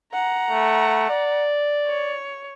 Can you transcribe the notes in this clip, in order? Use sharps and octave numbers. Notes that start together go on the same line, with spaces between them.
F#5 A#5
A3
D5
C#5